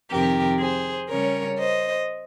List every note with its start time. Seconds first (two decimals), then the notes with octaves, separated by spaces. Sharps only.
0.11 F2 C3 D#3 G4 A#4
0.60 G#4 C5
1.10 C#3 G3 C#4 A#4 C#5
1.59 C5 D#5